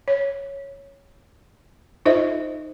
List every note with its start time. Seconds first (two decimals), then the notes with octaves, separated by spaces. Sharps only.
0.08 C#5
2.06 D#4 F4 A4 C5 D#5 E5